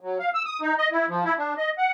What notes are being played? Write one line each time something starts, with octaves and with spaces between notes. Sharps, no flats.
F#3
F5
E6
D#6
D#4
D#5
E4
F3
E4
D4
D#5
F#5